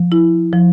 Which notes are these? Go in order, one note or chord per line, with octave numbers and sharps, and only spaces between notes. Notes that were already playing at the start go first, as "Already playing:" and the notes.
Already playing: F3
E4
F3